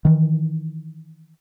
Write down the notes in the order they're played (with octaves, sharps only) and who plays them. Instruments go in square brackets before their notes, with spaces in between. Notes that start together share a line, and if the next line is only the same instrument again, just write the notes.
[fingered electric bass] D#3 E3